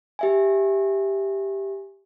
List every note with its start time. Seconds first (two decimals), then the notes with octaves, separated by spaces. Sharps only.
0.19 G4 E5 G#5